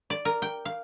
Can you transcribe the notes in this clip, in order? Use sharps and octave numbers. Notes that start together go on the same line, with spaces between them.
D5
A#4
G5
F5